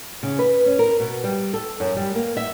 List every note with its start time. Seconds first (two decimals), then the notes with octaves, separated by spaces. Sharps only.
0.23 C#3
0.39 B4
0.66 C#4
0.79 A#4
1.00 B2
1.24 G3
1.54 A4
1.80 F#2
1.96 G3
2.15 A#3
2.37 E5